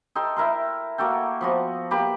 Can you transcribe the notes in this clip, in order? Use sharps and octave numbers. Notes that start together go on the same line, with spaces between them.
D#4 A4 G5 C6
E4 A#4 C6
A#3 F#4 A4 G5
F3 B3 F#4
A#3 G4 B4 B5